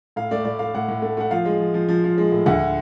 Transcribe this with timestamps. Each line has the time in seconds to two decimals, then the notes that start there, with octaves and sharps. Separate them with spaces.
0.16 A2 F5
0.31 A3 D5
0.45 A2 D5
0.59 A3 F5
0.75 A2 F#5
0.88 A2
1.02 A3
1.17 A3 F#5
1.31 F3 F5
1.46 G#3
1.60 F3
1.74 F3
1.89 F3
2.04 F3
2.18 G#3
2.32 A2
2.46 D2 F#5